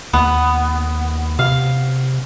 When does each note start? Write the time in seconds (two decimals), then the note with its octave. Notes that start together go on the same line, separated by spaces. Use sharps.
0.13 D#2 B3
1.39 C3 F5